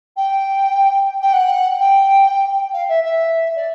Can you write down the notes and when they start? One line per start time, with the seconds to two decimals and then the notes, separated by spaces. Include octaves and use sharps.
0.16 G5
1.22 G5
1.33 F#5
1.80 G5
2.73 F5
2.89 E5
3.04 E5
3.56 D5